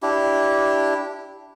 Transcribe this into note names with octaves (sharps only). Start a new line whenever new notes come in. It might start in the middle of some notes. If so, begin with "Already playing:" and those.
D4 E4 G4